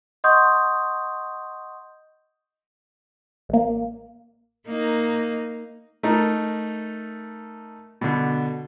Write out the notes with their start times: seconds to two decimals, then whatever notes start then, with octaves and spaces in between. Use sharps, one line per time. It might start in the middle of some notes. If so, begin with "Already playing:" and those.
0.24 D#5 F#5 C6 C#6 D#6 G6
3.49 A1 A#3
4.67 A#3 D#4
6.03 A3 D#4 A#4
8.01 B2 D3